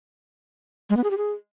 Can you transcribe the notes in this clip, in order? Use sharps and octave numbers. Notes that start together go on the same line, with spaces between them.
G#3
B3
G#4
G4
G#4